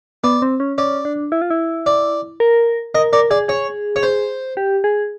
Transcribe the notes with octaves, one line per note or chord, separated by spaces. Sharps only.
B3 D5
C4
C#4
C#4 D5
D4
E4
F4
E4
D5
A#4
A#4 D#5
A#4 D5
G#4 D5
G#4 C#5
C#5
C5
G4
G#4